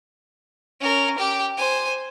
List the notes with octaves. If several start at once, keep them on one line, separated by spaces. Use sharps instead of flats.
C#4 A#4
G4 G5
C5 G#5